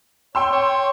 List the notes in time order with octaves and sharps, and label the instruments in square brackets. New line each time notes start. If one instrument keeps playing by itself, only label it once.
[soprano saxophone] C#5 [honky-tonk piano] G5 C6 E6
[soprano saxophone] C#5